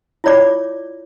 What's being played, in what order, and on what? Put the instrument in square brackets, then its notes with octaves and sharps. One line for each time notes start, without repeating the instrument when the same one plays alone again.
[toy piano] E4 F4 C#5 D5 D6